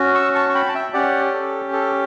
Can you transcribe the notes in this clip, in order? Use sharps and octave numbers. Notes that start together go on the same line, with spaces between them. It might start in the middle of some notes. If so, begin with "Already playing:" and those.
Already playing: C#4 F#4
C#6 E6
A5 C#6
C#6
G5 B5
A5
E5 G5
C#4 G4 D5 F#5
A4
A4